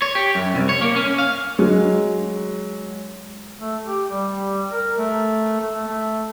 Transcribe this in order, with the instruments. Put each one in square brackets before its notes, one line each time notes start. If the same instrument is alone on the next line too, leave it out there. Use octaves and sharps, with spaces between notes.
[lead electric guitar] C#5
G4
F#2
C2
C#5
A#3
C#4
F5
[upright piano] F#3 G#3
[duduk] A3
G4
G3
A#4
A3
A3
A3